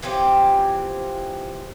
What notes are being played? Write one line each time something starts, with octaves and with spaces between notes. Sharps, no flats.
E3 F3 C4 G4